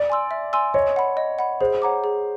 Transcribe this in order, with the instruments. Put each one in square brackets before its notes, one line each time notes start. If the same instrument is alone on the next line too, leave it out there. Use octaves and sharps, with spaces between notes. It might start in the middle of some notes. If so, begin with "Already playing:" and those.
Already playing: [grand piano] D5
[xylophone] G#5 C6 E6
E5
G#5 C6 E6
[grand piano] C#5 [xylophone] D#5
[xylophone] F#5 B5
D#5
F#5 B5
[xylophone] G#4 [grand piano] C5
[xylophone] C#5 F#5 A#5 D6
G#4